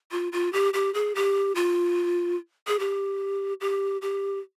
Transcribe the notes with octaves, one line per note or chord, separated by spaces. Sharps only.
F4
F4
G4
G4
G#4
G4
F4
G#4
G4
G4
G4